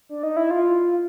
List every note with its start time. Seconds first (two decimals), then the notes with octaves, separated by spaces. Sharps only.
0.09 D4
0.23 D#4
0.37 E4
0.51 F4